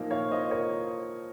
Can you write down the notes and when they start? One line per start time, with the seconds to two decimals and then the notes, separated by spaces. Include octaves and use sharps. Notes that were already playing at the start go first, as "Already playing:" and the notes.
Already playing: A#2 F3 A#3 D#4
0.11 C#5 F5
0.31 C5 D#5
0.51 A#4 C#5